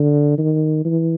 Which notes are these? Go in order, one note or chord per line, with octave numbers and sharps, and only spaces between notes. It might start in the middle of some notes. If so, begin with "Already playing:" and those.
Already playing: D3
D#3
E3